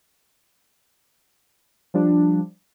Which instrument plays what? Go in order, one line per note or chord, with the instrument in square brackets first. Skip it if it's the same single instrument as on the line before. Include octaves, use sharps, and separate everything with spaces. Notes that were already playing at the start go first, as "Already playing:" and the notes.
[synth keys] F3 G3 D4